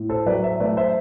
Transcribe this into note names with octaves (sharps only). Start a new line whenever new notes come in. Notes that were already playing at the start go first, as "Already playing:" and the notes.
Already playing: A2
A4 C5
F#3 B4 D5
C5 E5
A3 B4 D5
C5 E5